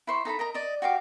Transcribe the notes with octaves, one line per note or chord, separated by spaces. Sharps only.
E4 C5 C#6
D#4 A4 A#5 B5
A#4 D#5 A#5
D5 D#5
F#4 G4 F5 D6